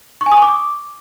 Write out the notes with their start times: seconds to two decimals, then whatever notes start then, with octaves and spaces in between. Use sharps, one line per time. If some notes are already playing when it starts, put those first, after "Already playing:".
0.21 C#6
0.26 G#5
0.32 D#6
0.37 C#6
0.42 D6